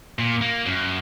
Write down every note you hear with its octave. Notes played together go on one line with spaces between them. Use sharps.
A#2
A#3
F#2